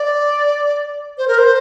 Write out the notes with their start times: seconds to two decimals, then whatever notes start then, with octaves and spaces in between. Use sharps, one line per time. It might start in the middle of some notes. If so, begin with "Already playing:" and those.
Already playing: D5
1.18 C5
1.28 A#4
1.38 C5